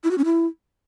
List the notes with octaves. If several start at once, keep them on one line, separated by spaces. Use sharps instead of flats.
E4
F#4
C#4
E4